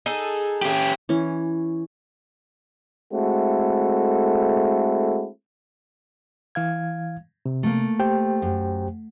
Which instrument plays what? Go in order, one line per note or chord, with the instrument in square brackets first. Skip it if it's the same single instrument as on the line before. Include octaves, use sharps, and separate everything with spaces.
[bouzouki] D#4 G#4 A4
[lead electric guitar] C#4 G4
[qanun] E3 C#4
[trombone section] G#3 A3 C4 E4 F#4 A4
[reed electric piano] E3 F5 G#6
C3
[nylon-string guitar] A3 A#3
[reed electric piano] G4 C5 G5
[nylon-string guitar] F#2